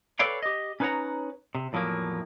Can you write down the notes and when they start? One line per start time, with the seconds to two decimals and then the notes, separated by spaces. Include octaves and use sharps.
0.19 A4 B4 C#5 D5 F5 G5
0.43 G4 D#5
0.80 C#4 D#4 B4 C#5 F#5 A#5
1.55 C3
1.73 E2 A2 F3 F#3 A#3